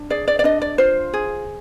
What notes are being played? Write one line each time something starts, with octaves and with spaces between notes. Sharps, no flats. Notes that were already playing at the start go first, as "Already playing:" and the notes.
Already playing: D4
G#4 D5
D5
D5
D4 D#5
D5
F4 C5
G#4